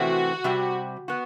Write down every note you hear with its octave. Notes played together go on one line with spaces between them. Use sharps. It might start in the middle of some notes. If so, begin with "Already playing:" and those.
Already playing: C3 E3 A3 C4 F#4
C3 G3 C4 G4
B3 F#4